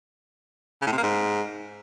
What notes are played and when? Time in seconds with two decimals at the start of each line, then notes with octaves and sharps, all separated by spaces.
0.81 C#3
0.87 A2
0.92 C3
0.97 A#3
1.03 G#2